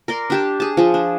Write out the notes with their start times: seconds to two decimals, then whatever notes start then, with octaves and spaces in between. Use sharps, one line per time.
0.08 A#4 D5 C6
0.30 D4 G4 A5
0.60 G#4 A5
0.77 F3 G#4
0.94 D4